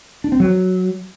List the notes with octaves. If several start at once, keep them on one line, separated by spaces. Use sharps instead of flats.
D4
C4
F#3